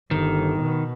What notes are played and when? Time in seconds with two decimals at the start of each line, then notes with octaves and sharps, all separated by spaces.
0.11 G1 D#3
0.61 B2